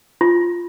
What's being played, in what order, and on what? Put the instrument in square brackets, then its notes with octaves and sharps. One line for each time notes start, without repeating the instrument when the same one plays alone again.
[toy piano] F4